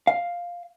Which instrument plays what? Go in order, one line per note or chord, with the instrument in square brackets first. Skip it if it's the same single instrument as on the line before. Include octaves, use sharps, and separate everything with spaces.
[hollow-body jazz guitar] F5